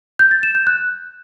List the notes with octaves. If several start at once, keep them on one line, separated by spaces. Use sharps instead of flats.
G6
A6
E7
G6
F#6